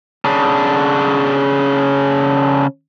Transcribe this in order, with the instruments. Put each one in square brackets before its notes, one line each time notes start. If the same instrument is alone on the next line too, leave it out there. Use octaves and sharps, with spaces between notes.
[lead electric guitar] C#3 D4